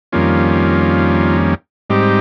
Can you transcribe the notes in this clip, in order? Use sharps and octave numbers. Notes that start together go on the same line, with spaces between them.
F2 D#3 G3 A#3 C#4 F4
G#2 G3 C4 D#4 G4